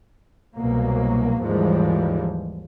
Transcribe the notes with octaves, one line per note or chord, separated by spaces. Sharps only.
C2 B2 F#3 A#3
D#2 G#2 E3 F3 G3 G#3